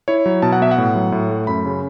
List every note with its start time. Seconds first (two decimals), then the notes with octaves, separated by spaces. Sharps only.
0.08 E4 C#5
0.26 F#3
0.42 B2 A5
0.52 F#5
0.61 B3 E5
0.71 F#5
0.78 A2
0.95 F#3
1.12 A2
1.30 A3
1.47 F#2 B5
1.66 C#3